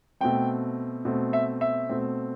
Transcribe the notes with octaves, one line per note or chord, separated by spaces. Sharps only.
B2 A3 C4 G5
B2 A3 C4
E5
E5
B2 A3 C4